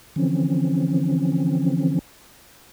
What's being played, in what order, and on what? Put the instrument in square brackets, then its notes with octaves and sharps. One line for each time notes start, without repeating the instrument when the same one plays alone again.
[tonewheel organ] D3 E3 F3 C4 C#4